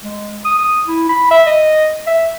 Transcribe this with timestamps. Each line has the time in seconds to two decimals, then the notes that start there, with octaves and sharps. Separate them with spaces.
0.04 G#3
0.45 D#6
0.58 D#6
0.87 E4
1.09 B5
1.31 E5
1.46 D#5
2.07 E5